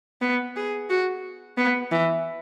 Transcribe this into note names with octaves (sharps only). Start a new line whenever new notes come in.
B3
G#4
F#4
B3
E3